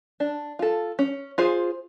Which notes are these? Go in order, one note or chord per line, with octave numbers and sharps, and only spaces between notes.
D4
F4 A4
C#4
F4 G#4 C5